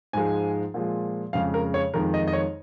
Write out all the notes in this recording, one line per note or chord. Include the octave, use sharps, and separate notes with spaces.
G#2 F3 G#3 G#5
A#2 F3 G#3
F2 C#3 G#3 F5
A#4
C#5
F2 D#3 G#3 A#4
D#5
D#5
C#5